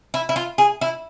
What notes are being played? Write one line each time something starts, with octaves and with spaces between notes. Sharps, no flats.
E4
E4
F4
G#4
E4